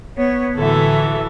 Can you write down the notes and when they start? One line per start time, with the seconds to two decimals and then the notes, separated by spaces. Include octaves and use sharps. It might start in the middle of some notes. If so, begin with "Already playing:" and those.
0.17 B3 C#5
0.56 A2 D3 E3 F#3 A4 E5